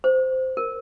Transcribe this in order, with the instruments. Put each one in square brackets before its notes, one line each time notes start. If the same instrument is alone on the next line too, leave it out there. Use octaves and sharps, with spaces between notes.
[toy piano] C5
A#4